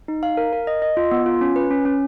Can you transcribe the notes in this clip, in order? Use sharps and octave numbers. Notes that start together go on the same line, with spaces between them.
D#4
F5
A#4
A#4
D#5
D#5
F4
B3
F4
C#4
B4
C#4
C#4